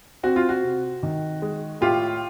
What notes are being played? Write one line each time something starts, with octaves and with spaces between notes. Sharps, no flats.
C4 F#4
F4
F#4
C3
D#3
G#3
A2 F4 G4